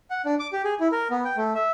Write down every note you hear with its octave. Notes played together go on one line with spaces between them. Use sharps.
F#5
D4
D6
G4
G#4
E4
A#4
B3
G5
A3
E5